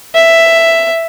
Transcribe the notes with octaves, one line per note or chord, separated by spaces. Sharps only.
E5